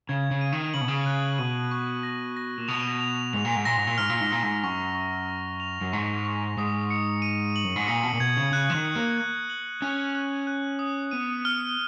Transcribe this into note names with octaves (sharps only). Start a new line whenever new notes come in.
C#3 G#6
C#3
D#7
D#3
C#3 F#7
B2
C#3
F#6
B2 D#7
C#6
A#6
A#6
A#2
B2 F7
F7
G#2 F7
A#2
G#2
A#2 A#6
G#2
A#2
G#2 F6
A#2
G#2
A#2 F6
G#2
F#2 C#6
C#6
A#6
F7
F#2
G#2 C#6
C#6
G#2 D#6
C#7
D#7
F#7
F#2
G#2
A#2 C#7
B2
A#2
B2 G#6
C#3
C#3 F#6
F3
D#3
C#7
A#3
G#6
F#7
C#4 F#6
F#6
F#6
D#6
B3 D#7
F6